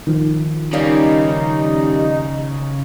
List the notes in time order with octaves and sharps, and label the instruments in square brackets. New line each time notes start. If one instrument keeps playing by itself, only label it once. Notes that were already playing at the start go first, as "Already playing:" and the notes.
[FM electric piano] D#3 F3
[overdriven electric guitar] C#3 [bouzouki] G3 A#3 C#4 [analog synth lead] D#4